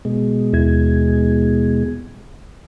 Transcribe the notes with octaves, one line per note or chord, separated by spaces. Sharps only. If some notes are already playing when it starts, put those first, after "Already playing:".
B2 G#3
D#2 E4 G#6